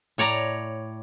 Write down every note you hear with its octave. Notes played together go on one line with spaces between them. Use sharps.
A2 C#5 D5 A#5